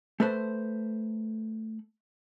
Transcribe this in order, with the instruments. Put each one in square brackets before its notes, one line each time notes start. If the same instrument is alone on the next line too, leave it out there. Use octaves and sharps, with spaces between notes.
[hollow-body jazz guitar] A3 A4 B4 C5